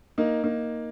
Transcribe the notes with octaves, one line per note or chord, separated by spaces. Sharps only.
A#3 D#4
A#3 D#4